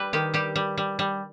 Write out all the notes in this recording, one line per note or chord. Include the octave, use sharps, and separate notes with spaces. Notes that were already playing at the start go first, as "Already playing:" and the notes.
Already playing: G3 B4
D#3 G4
G3 G4
G3
G3
G3